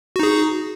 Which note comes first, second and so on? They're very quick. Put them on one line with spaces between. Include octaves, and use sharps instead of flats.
F#4 D#4 G#4